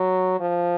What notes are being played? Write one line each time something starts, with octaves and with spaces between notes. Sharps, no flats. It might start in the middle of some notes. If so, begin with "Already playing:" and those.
Already playing: F#3
F3